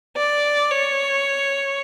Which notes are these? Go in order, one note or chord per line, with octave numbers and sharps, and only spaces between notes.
D5
C#5